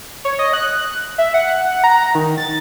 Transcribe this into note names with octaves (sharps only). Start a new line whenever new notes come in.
C#5
D#5
F#6
E5
F#5
A#5
D#3
A6